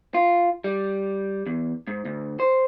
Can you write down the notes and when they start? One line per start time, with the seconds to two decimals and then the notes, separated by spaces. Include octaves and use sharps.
0.14 F4
0.64 G3
1.47 E2
1.87 G#2
2.05 D2
2.40 C5